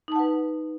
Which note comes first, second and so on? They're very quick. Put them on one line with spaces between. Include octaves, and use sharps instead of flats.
D#4 A5 F#5 B4